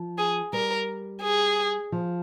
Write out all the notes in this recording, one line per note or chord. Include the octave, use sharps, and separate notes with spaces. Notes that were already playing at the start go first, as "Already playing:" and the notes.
Already playing: F3
G#4
G3 A#4
G#4
F3